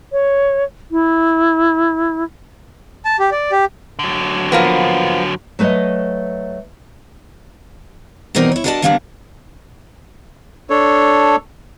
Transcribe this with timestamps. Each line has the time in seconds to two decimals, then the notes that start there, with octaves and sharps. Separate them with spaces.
0.12 C#5
0.91 E4
3.05 A5
3.19 G4
3.31 D5
3.52 G4
3.99 D3 F#3
4.52 F3 A#3 B3
5.59 F#3 A3 B4 C#5 D#5
8.35 B2 E3 C4 D#4 A#4 D5
8.52 E4 C#5
8.64 D4 F#4 A#4 D5 D#5 A5
8.82 D3 G3 A#3 B3 C#4 D4
10.70 D4 A4 C#5